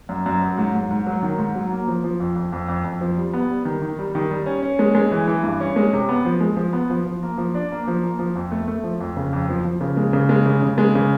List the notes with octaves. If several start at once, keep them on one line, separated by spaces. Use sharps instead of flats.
F#2
F#2
F#3
G#2
G#2
G#2
F#3
D#3
G#2
F#3
A#3
F3
F3
F2
F2
F2
F2
F2
F3
G3
B3
G3
D#3
D#3
G3
D#3
G3
C#4
C#4
G#3
G#3
E3
E3
G2
C#4
G#3
C3
B3
F3
G#3
F3
B3
F3
F3
A#3
F3
D4
A#3
F3
A#3
F3
F2
A3
A3
F3
F2
C#3
F2
F3
F3
C#3
G#3
C#3
G#3
C#3
C#3
G#3
C#3